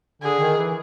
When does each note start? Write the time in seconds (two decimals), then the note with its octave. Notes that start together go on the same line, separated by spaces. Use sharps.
0.22 D3 G#4
0.39 D#3
0.57 E3